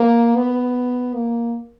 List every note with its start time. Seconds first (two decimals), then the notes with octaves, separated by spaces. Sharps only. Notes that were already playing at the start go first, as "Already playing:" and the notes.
Already playing: A#3
0.35 B3
1.14 A#3